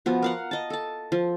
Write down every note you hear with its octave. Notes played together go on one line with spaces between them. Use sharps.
F3 B3 F#4
A#4 F5 F#5
D#5 A5
A4 A5
F3